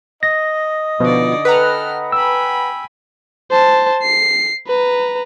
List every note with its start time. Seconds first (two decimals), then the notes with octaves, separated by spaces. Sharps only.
0.23 D#5 A#6
1.00 B2 D3 F3 D#4 D5
1.45 A4 B4 F#5 G5 A#5 F6
2.12 G5 G#5 B5 E6
3.51 C5 A5
4.03 C7
4.67 B4 A#5